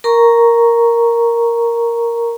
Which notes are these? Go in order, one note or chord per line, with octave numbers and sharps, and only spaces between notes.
A#4 A#5 C#6